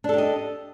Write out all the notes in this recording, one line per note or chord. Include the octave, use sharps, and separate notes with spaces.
D4 G4 A4 D#5